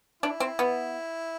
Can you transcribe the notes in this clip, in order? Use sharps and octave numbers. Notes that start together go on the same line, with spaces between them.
D4 E4
C4
B3